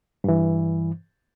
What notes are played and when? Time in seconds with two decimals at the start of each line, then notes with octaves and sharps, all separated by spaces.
0.24 G2 E3